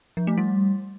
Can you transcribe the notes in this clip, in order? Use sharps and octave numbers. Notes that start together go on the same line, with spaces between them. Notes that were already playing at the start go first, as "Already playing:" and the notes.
F3
A3
G3